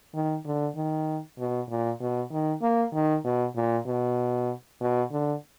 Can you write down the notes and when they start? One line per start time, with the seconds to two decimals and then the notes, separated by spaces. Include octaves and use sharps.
0.14 D#3
0.46 D3
0.76 D#3
1.39 B2
1.69 A#2
2.00 B2
2.32 D#3
2.62 A#3
2.94 D#3
3.25 B2
3.56 A#2
3.87 B2
4.81 B2
5.12 D3